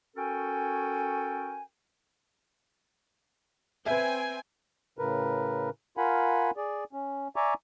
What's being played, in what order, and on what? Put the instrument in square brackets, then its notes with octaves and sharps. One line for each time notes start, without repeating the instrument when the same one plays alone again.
[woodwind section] C#4 F#4 A4 A#4 G5 G#5
[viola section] C4 G5 G#5 [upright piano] B4 E5
[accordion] A2 C#3 A#4 B4
F4 A#4 F5 F#5 G#5 B5
G#4 D5
C#4
D5 E5 G#5 A#5 C#6 D6